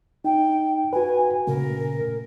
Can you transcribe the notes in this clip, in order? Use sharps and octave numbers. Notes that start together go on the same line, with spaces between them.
D#4 G5
F#4 B4 G#5
A#2 C#3 A3 A#4